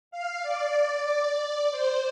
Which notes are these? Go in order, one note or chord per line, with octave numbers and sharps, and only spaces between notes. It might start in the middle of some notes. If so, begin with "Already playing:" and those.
F5
D5
C5